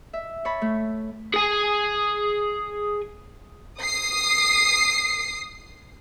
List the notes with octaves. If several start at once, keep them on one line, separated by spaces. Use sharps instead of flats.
E5
C#5 A5 B5
A3
G#4 G#5
D#6 C7